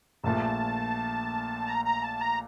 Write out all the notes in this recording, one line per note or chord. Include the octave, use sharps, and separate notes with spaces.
A#1 A#2 A3 A5
A#5
A#5
A5
A#5